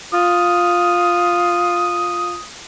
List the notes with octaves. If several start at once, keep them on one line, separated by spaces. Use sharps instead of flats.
F4 D#6